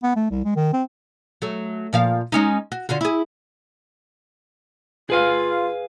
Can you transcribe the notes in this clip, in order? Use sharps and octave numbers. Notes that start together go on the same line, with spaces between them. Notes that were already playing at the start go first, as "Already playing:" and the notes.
B3
A3
C2
G#3
D#3
C4
F#3 A3
A#2 F3 F5
G#3 C#4 D#4
F#4
D3 F4 F#4
E4 G#4
F4 G#4 B4 F5